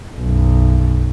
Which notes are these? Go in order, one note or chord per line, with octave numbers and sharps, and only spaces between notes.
B1 F#2